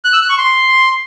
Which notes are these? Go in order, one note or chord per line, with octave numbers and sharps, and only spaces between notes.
F#6
E6
F#6
C#6
C6